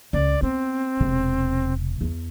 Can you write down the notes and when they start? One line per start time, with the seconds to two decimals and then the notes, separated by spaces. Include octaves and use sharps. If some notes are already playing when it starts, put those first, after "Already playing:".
0.13 C#2 D5
0.42 B3 C4
1.00 E1 C3
2.01 E2 E4